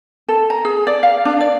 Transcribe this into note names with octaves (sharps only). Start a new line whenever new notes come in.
A4
A#5
G#4
D5
F5
D4
D5